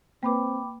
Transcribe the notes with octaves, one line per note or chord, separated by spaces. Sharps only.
A#3 C4 B4 G5 B5 D6